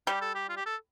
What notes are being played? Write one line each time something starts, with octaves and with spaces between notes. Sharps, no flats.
G3 G4
A4
G4
F4
G4
A4